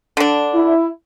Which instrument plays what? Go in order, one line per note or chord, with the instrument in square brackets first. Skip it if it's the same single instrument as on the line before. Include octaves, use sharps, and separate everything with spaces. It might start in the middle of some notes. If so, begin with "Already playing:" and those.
[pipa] D3 D4
[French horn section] E4